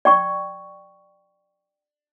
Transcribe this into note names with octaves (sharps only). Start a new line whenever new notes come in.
D5 G5 C#6